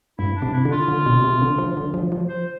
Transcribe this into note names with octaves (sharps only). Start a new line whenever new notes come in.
G2 E4
D4
C3
E4
D3
F4
D3
B2
C3
D3
F3
D3
F3
F3
C5